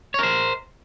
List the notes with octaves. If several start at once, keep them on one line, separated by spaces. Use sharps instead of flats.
A#4 C5 C#5